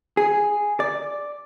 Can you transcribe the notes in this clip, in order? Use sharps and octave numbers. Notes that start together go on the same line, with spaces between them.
G#4
D5